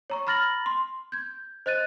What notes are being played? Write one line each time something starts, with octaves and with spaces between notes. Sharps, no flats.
C#5 A#5 C#6
A#5 B5 F6 A6 A#6 F#7
C6
G6 G#6
C5 D#5 F#6 A6 D#7